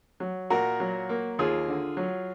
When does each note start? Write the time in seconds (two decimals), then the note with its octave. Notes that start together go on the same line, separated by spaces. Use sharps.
0.20 F#3
0.50 A#2 F#4 A#4
0.80 F#3
1.09 A#3
1.39 D#2 F4 G#4
1.68 D3
1.97 F#3